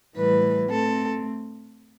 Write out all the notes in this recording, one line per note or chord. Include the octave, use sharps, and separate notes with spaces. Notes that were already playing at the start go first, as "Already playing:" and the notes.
A2 E3 G3 B4
A3 C4 A4